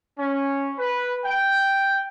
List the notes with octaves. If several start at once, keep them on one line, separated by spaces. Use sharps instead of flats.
C#4
B4
G5